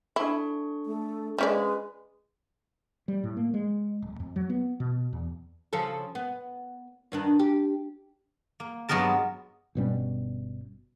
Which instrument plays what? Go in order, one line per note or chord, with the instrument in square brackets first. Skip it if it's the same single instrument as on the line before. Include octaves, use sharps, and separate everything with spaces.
[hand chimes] D4 A4 C#6 [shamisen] E4
[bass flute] A3
[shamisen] F3 C#4 D5 [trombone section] G#3 [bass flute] B4
[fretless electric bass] G3
A2
A#3
G#3
D1
F2
F#3
B3
B2
E2
[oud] C#3 F3 A4
B3
G2 D#3 D4
G4
[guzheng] A#3
G2 F#3 G#3 B3 A#4 A5
[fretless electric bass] G1 B2 G3 C#4